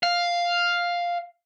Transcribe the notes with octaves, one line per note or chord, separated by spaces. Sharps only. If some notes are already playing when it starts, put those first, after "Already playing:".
F5